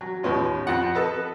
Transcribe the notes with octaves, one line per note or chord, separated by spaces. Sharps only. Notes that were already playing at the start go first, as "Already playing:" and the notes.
F#3
D#2 A2 B3 C#4 F4
F2 F4 F#5
A4 B4 D#5